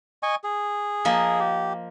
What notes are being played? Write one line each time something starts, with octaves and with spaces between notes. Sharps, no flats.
D#5 G#5 C#6
G#4
F3 A#3 D#5
G4